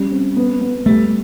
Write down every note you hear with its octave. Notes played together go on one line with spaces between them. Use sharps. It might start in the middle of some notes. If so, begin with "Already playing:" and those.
Already playing: G3 C#4
C4
B3
B3
G3 A3